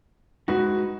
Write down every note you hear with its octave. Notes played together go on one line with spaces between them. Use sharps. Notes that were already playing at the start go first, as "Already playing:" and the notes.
G#3 D#4 F#4 B4